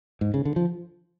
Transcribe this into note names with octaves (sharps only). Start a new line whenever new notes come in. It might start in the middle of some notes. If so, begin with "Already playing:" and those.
G#2
C#3
D3
F3